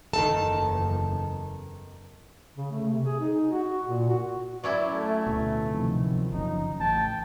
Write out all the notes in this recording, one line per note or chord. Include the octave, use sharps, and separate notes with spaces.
F#1 E2 D#3 D#4 A4 A5
C#3
A3
C3
G#4
D#4
F#4
A#2
F#4
F#3 C#4 E4 D5
A3
D1 B2
C3 D#3 F3
F#1 F#2 F3 D#4
A1 G5 A5